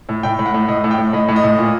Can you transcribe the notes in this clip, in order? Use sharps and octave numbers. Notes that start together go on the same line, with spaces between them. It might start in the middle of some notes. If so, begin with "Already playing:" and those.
A2
A2 G5
A2
F#5
A2
A2 D#5
A2
G5
A2
A2 D#5
A2
D#5
A2
A#2